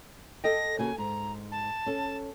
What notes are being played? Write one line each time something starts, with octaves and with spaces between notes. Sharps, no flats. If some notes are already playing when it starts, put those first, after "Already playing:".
A4 D#5 G5 A#6
C#3 A#3 F#4 G#5
G#2 A#5
A5
C#4 A4